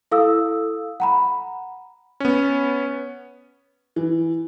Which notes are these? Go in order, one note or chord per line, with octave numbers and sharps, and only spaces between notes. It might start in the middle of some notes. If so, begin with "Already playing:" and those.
E4 A4 F5 D#6 E6
F#5 A#5 B5
B3 C#4
E3